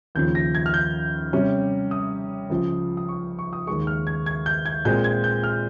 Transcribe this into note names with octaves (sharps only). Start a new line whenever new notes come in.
D#2 C#3 F3 G6
A#6
G#6
F6
G6
C3 G3 C#4
D#6
C#2 C#3 F3
D#6
C#6
C#6
D#6
D#2 D#3 G#3 C#6
F6
G#6
G#6
G6
G#6
A#2 G#3 C4 G6
G#6
G6
F6